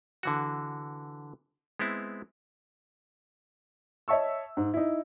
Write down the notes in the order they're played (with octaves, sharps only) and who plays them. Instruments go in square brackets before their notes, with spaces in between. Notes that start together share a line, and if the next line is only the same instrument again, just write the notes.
[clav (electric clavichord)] D3 E3 F#4
G#3 B3 C4 E4
[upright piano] C#5 D#5 E5 A5 C#6 E6
G#2
D#4 E4